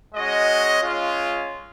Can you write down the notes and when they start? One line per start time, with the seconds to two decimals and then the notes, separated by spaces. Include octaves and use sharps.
0.14 G#3 C#4 F#4 D#5
0.82 G#3 C#4 F4